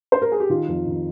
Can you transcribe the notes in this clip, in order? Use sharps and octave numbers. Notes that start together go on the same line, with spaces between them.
C5
A#4
G#4
G4
D#3 F4
F2
D#3